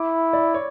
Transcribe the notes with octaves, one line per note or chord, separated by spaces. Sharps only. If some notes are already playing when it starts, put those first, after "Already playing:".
Already playing: E4 D6
D5
C#5